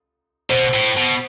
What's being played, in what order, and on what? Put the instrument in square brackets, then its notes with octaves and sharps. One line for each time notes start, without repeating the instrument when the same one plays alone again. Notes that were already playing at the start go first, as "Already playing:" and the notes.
[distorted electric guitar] B2 [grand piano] C5
[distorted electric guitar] A2
B2